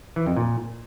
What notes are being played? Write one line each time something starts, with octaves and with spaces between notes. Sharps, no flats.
E3
F2
A#2